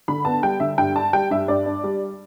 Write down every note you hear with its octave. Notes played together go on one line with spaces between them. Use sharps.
D3 B5
B3 A5
G3 G5
D3 E5
G2 G5
D4 A5
G3 G5
G2 E5
G2 D5
D4
G3